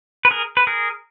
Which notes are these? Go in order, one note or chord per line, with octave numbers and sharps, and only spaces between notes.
B4
G#4 A#4
B4
G#4 A#4